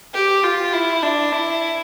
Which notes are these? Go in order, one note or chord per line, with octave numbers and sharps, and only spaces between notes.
G4
F4
E4
D4
E4